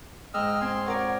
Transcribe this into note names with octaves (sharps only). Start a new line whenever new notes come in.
G#2 D#5 G5 E6 F6
C4 G#5 C6
F4 A#4 C#5 D5 F#5